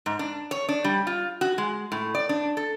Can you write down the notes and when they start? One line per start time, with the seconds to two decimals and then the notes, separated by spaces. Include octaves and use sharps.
0.06 G#2
0.19 D4
0.51 C#5
0.69 D4
0.84 G3
1.07 F4
1.41 F#4
1.58 G#3
1.92 A2
2.15 D5
2.29 D4
2.57 A4